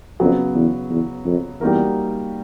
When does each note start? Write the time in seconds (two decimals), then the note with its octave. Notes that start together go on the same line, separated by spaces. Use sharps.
0.20 F2 C#3 F#3 B3
0.55 E2
0.90 E2
1.26 F2
1.61 E2 G3 A#3 D#4 F#4 A#4